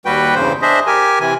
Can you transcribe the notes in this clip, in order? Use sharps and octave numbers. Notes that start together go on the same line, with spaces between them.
D#2 G3 F#4 B4 G5
E2 G2 C#3 C5
D4 G#4 C5 D#5 E5
G4 A#4 G#5
C3 E3 G#5